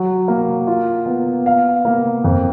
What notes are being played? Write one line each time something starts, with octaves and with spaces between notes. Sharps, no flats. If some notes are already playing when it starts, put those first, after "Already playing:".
Already playing: F#3
A#3
F4
B3
F5
A#3
F2